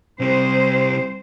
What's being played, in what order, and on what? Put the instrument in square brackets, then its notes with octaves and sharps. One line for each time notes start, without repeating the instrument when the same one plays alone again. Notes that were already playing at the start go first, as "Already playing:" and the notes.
[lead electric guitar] C3 G3 [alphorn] C4 [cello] C5